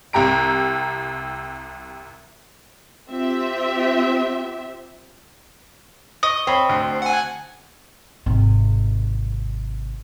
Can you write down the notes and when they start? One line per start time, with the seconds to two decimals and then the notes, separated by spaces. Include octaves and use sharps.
0.13 C2 C3 G4 A#5 D7
3.11 C4 F4 G4 E5
6.23 D#5 C#6
6.47 C4 C#5 B5
6.69 D2
7.02 F#5 G#5
8.26 G#1 C3